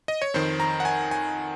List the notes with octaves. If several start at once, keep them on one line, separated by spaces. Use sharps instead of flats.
D#5
C#5
F2 D#3 C5
A#5
F#5
G#5
G#5